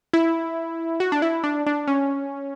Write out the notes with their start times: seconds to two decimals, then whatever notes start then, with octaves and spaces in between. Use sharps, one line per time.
0.13 E4
1.00 F#4
1.12 D4
1.22 E4
1.44 D4
1.67 D4
1.87 C#4